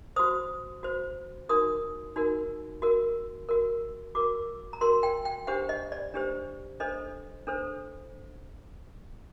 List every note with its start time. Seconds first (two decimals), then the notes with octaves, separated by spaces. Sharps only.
0.16 F#4 C5 D#6
0.83 F#4 C5
1.49 D#4 F#4 A#4 D#6
2.16 D#4 F#4 A#4
2.82 F#4 A#4
3.49 F#4 A#4
4.15 F#4 A#4 D6
4.73 A#5
4.81 F#4 A#4 C6
5.03 G5
5.25 G5
5.47 D4 G4 C5 F#5
5.69 D#5
5.92 D5
6.14 D4 G4 C5
6.80 D4 A4 C5 D#5
7.47 D4 A4 C5